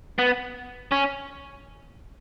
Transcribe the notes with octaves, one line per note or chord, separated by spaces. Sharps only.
B3
C#4